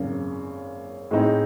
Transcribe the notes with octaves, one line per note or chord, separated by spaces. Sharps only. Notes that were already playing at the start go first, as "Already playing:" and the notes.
Already playing: G#1 F#2 C#3
A2 G#3 C4 D#4